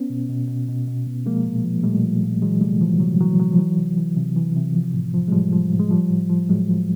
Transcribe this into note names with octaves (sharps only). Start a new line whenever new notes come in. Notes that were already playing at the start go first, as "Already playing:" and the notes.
Already playing: B3 C#4
B2
B2
B2
B2
B2
B2
F3 G#3 A#3
A#2
F3
A#2 G3 A3
F3
A#2
E3 F#3 G#3
C3 G3 A3
E3 F3
C3 F#3
E3 F#3
C3 F#3
F3
E3 F#3
C3
E3
C3
E3
C3
F3
A2
F3
G#3
A2 F3 G3
F3
A2
G#3
F3 G3
A2
F3
A2 F#3 G#3
F3